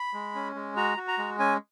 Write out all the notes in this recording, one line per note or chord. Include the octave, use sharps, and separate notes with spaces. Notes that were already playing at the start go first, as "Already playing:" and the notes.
Already playing: B5
G#3
C#4
G#3
F#4 A#5
F#4
A#5
G#3
C#4 G#5